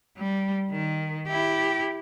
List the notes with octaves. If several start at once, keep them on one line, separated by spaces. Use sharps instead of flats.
G3
D#3
E4 G4